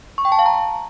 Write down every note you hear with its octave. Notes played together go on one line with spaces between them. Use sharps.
C#6
G5
A5
F5
A#5